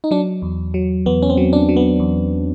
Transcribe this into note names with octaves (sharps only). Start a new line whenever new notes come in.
D#4
F#3 D4
E2
F#3
E2 B3
C#4
C4
F#3
D4
F#3
B3
E2